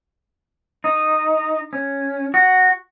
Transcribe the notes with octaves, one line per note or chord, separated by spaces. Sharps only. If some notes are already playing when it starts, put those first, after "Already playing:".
D#4
C#4
F#4